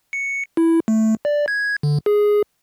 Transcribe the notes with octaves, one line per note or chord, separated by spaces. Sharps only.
C#7
E4
A3
D5
G#6
D3
G#4